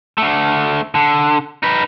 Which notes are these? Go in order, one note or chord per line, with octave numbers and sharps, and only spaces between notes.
D3 A3
D3
D#4 B4